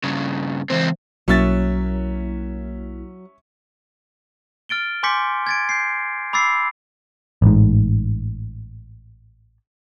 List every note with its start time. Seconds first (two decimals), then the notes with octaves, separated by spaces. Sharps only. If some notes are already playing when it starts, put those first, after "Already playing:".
0.04 G2 C#3
0.70 C#2 E3 C4 C5
1.28 B1 F#3 A#3 C#4 E4 E5 A6
4.69 F6 A6 D7 G7
5.03 G#5 C6 D6 G6 B6 C#7
5.47 G#6 A6 D7
5.69 G6 C7
6.33 B5 D6 E6 A6 C7
7.42 A1 G#2